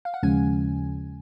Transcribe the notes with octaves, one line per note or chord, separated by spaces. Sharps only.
F5
F#5
D#2 C#3 F3 G#3 C#4 G#5